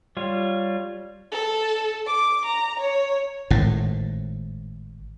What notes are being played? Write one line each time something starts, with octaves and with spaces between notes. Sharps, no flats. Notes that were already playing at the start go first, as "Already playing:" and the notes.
G3 F4 C#5
A4
D6
A#5
C#5
G#1 A2